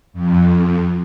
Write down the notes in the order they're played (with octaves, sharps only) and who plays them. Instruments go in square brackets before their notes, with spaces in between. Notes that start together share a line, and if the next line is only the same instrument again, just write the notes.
[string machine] F2